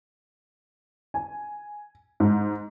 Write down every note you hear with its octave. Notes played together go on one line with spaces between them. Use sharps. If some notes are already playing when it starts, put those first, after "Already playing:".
G#5
G#2